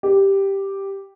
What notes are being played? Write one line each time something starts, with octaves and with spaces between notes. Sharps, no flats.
G4